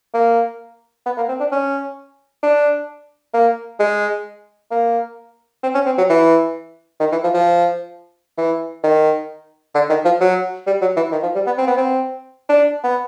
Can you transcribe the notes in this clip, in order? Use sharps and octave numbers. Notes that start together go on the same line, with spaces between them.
A#3
B3
A#3
C4
D4
C#4
D4
A#3
G#3
A#3
C4
C#4
C4
F#3
E3
D#3
E3
F3
F3
E3
D#3
D3
D#3
F3
F#3
G3
F#3
E3
D#3
F3
G3
B3
C4
B3
C4
D4
B3